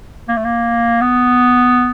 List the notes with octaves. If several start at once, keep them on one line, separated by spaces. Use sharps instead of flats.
A#3
A3
A#3
B3